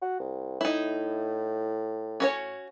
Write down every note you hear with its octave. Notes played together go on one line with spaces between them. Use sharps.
F#4
C2
A2 D#4 E4
C#4 F#4 C#5